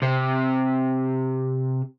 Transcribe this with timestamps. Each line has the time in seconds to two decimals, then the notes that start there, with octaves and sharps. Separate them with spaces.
0.02 C3